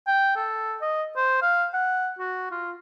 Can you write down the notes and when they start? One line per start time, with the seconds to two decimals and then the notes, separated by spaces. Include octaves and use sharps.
0.07 G5
0.36 A4
0.81 D#5
1.16 C5
1.42 F5
1.74 F#5
2.19 F#4
2.51 F4